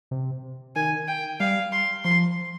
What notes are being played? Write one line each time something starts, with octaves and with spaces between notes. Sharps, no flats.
C3
D#3 G#5
G5
G3 F5
C6
F3 C6